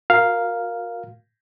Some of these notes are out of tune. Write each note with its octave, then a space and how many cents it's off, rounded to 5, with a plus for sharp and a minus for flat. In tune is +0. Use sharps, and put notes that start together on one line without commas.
F#4 -35 A#4 +0 F5 +0